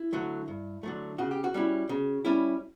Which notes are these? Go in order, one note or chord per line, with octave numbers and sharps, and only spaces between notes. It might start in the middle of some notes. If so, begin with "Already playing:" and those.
Already playing: E4
D3 F#3 A3
G2
D3 F#3 A3
C#3 F#4
G4
F#4
G3 C#4 E4
C#3
G3 C#4 E4